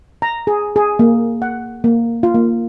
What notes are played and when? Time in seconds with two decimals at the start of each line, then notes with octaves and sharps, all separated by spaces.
0.22 A#5
0.47 G#4
0.76 G#4
0.99 A#3
1.42 F#5
1.84 A#3
2.23 F4
2.34 A#3